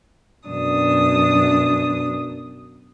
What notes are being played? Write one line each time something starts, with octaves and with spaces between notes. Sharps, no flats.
F#2 B2 D4 D#6